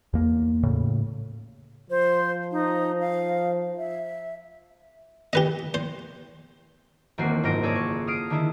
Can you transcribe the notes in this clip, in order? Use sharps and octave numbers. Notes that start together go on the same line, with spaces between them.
E2 A#3
A2 C#3
F3 C5
D#4
F5
E5
G4 B4 D#5
C5
E1 D#3 A#3 C4 F#4 C7
F#1 G#2 F4 A#4 A#6 D7
G#4 A4 C#5 D5
C#6
D#6 F6 C7 D7
D3 D#3 E4